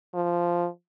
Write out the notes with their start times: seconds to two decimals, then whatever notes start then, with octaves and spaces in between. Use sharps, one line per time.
0.15 F3